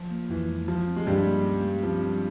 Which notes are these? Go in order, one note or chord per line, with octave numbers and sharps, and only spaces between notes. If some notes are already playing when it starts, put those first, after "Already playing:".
Already playing: F3 F4
A#3
F2 E3
G#3
F3 E4
C4
G#3
G2 G3 F4
A#3
C#4
G#3
F3 C4
G3